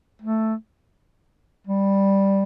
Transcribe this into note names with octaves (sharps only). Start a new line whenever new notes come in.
A3
G3